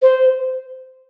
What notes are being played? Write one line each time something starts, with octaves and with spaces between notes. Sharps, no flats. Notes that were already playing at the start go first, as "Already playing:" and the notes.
C5